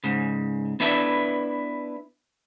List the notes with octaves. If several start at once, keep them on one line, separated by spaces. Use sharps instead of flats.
G#2 C#3
B3 D4 E4 B4 E5